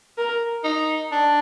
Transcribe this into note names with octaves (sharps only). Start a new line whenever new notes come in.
A#4
D#4
D4